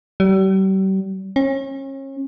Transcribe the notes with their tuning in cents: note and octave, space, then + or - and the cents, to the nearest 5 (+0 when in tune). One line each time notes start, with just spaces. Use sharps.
G3 -40
C#4 -35